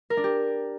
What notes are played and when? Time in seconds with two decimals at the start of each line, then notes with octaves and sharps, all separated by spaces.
0.10 A#4
0.17 D4
0.24 G4